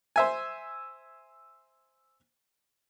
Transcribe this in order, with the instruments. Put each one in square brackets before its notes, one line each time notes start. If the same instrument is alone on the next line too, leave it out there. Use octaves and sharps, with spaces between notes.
[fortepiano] C5 E5 G#5